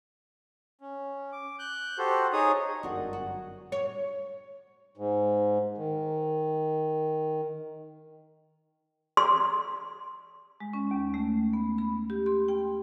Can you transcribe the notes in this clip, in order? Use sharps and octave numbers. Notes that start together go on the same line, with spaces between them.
C#4
D6
F#6 G6
F#4 G4 A4 C5
D#4 G#4 C#5 D#6
G1 F#2 D4 F#4 A#4
F#4
C#5
G#2
D#3
C6
G#3
C#4
D#2
A3
B3
B5
G4
C6
G5